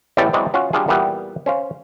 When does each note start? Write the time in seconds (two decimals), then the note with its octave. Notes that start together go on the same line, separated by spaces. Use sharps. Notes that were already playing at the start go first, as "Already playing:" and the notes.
0.17 A1 E2 A2 G4 A4 D5
0.33 E3 F#3 G#3 C4 D5 D#5
0.54 C#4 F4 F#4 F5 F#5
0.73 G3 D4 F4 G#4
0.88 E2 A#2 E3 G3 B3 G4
1.46 C#4 C5 F5